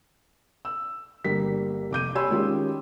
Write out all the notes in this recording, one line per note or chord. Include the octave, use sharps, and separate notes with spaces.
E6
G1 G3 A#3 B6
F1 D6 G6 D#7
G4 C#5 G#5 B5 C6 E6
D#3 G#3 C#4 F4 G4